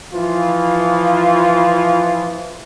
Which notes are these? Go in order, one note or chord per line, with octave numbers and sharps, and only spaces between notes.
E3 F3 F4